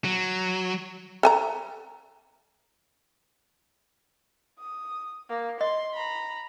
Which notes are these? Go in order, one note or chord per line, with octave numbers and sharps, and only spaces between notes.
F#3
A4 G#5 A#5
D#6
A#3
D#5 C6
A#5 B5